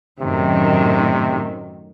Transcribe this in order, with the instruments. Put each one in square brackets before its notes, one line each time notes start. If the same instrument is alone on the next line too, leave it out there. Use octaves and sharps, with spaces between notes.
[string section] F#2 A2 D#3 [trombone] C3